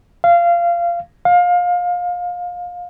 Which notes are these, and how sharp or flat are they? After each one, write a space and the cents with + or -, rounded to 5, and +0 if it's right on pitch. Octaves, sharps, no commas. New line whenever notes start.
F5 -20
F5 +25